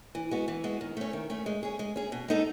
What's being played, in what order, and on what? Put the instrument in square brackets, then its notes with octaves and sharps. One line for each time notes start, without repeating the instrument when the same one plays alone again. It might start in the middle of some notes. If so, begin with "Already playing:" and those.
[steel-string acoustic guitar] E3
G#3 B3 F#4
E3
G#3 B3 F#4
D#3
A3 C#4
D#3
A3 C#4
G#3
C#4 G#4
G#3
C#4 G#4
B2
G#3 B3 D#4 A4